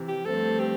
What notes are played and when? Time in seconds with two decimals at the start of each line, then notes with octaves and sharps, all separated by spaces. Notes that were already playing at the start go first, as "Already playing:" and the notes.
Already playing: C3 E3
0.08 G4
0.25 G2 F3 A3 C4 A4
0.59 G4